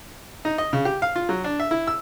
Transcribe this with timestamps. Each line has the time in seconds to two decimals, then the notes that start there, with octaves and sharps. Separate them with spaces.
0.45 D#4
0.58 D#5
0.73 C#3
0.85 G4
1.02 F5
1.16 F4
1.29 F#3
1.44 D4
1.60 E5
1.71 E4
1.87 E6